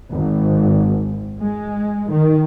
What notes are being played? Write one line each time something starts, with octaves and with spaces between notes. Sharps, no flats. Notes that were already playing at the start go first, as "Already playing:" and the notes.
G#1
G#3
D#3